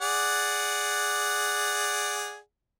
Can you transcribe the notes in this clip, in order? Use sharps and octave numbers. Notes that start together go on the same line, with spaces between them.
G#4 D5 F#5